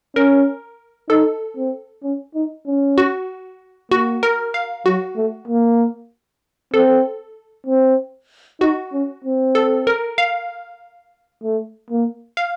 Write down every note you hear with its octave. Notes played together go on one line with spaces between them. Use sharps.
C#4 A#4
D#4 A4
C4
C#4
D#4
C#4
F#4
A#3 F#4
A#4
F5
F#3 F#4
A3
A#3
C4 A4
C4
D#4 F#4
C#4
C4
A4
A#4
F5
A3
A#3
F5